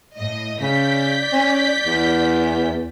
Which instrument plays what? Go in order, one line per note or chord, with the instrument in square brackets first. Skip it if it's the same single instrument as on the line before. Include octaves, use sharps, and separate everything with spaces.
[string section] A2 D#5
[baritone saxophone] C#3 [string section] D5 G6 B6
[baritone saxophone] C#4
E2